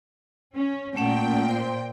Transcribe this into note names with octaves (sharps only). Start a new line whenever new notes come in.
C#4
A#2 A3 C#4 F#5 G5
C5 C6